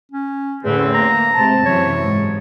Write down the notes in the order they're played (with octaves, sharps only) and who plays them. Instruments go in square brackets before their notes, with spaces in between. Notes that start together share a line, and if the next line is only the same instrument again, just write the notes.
[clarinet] C#4
[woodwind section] E2 D3 C4 [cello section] A2 C#4 [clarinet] B4
[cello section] A#3 [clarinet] A#5
[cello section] C3 G#3 C4 [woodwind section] A5
[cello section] F#2 C3 E3 [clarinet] C#5
[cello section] G#2